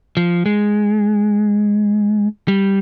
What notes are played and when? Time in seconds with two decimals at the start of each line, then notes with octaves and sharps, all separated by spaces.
0.17 F3
0.46 G#3
2.48 G3